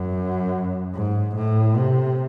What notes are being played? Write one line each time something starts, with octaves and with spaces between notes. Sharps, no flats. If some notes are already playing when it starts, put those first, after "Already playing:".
Already playing: F#2
G#2
A2
C3